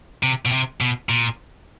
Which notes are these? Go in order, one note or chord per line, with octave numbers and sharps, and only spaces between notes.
C3
B2
C3
B2
A#2